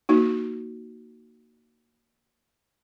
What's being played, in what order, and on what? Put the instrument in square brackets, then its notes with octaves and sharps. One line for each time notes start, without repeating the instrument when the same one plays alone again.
[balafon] A#3 D#4 F#4